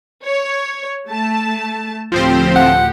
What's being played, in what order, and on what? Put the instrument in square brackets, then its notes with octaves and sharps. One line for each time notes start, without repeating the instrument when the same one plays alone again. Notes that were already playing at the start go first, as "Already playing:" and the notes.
[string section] C#5
A3 A5
[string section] D2 A2 G4 [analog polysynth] F3 C4 C5
[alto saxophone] F#5